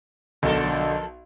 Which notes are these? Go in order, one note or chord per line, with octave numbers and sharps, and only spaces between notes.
B1 D3 F3 A4 A#4